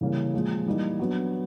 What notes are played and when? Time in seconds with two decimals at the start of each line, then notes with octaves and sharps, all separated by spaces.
0.01 C#3 E3 G3 A#3 C#4
0.34 A#2 F3 G#3
0.66 E3 G3 A#3 D#4
0.99 F#3 B3 D4